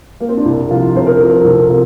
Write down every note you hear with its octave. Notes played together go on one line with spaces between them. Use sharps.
A#3
C4
D4
C2 E4
C3 F3 F4
C2 C5
A#4
C3 F3 A4
A#4
C2 A4
C3 F4